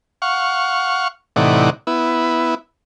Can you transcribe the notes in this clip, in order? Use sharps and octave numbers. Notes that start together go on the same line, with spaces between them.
F5 F#5 C#6
A2 C3 E3 D#4 D5 F#5
B3 E4